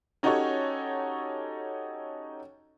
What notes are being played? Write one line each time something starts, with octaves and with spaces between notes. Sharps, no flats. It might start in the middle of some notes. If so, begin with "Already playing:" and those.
C#4 D#4 F#4 G4 A4 C#5